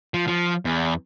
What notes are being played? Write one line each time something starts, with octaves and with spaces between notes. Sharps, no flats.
F3
F3
E2